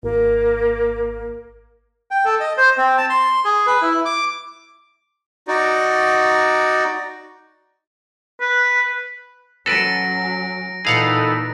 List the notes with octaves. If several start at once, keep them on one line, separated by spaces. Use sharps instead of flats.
G#1 A#3
G5
A4
D#5
C5
C4
A5
C6
G#4
B4
E4
D6
D#4 F#4 D5
B4
F#3 C#4 A4 B4 A#6 D7
A#2 E3 D#4 G#4 A4 B4 F5 F#5